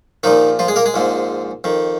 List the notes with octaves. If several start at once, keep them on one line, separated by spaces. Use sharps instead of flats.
A#1 A#2 D#3 F3 D#4
F3 F4
G#3 G#4
A#3 A#4
G#3 G#4
A#1 G#2 F3
F2 D#3